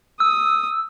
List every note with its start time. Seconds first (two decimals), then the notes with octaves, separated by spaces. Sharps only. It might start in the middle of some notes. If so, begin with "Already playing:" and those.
0.20 D#6 E6